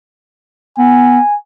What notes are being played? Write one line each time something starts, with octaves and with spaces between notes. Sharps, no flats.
B3 G#5